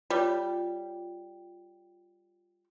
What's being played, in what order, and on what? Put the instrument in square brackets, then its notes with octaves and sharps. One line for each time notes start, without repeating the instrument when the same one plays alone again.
[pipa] G3 [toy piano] F4 C#5